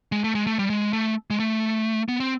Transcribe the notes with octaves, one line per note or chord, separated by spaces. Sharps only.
G#3
A3
G#3
A3
G3
G#3
A3
G#3
A3
B3
C4